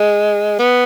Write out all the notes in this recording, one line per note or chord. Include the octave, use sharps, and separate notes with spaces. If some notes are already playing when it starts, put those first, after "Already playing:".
Already playing: G#3
B3